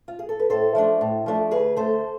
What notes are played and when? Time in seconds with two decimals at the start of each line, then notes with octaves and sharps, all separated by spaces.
0.08 F4
0.19 G#4
0.29 A4
0.39 B4
0.50 A2 A4 C5
0.75 F3 A3 D4
1.01 A2
1.26 F3 A3 D4
1.51 D2 G#4 B4
1.76 D3 A3 A4 C5